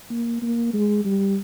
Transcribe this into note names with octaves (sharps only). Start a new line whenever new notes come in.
A#3
A#3
G#3
G3